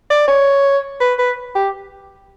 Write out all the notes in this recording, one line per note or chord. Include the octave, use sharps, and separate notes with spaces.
D5
C#5
B4
B4
G4